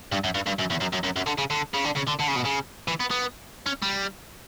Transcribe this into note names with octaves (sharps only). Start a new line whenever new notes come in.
G2
F#2
G2
G2
F#2
E2
F#2
F#2
F#2
F#2
D3
C#3
D3
C#3
D3
C#3
D3
D3
C#3
B2
C#3
E3
B3
B3
C#4
G3